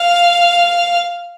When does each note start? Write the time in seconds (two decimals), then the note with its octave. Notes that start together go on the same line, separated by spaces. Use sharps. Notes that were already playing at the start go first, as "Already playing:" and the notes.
Already playing: F5